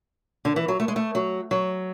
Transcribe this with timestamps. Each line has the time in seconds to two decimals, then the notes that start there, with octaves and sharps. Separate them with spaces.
0.45 D3
0.56 E3
0.68 F#3
0.80 A3
0.88 G#3
0.96 A3
1.15 F#3
1.51 F#3